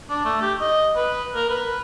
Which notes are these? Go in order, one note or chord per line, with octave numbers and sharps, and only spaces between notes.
D4
A3
G4
D#5
B4
A#4
B4